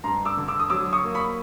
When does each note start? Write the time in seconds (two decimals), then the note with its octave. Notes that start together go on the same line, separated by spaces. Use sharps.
0.04 G2 A#5 C6
0.25 D6 E6
0.37 D3
0.48 D6 E6
0.60 D#6
0.70 F#3 D6 E6
0.93 C#6 D#6
1.03 A#3
1.14 B5 C#6